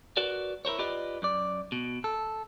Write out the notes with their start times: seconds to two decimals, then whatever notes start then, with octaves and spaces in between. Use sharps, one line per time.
0.17 F#4 A#4 B4 D5
0.65 E4 A#4 C5 C#5
0.79 F4 G4 B4 D5 D#5
1.22 F#2 D5
1.72 B2
2.04 A4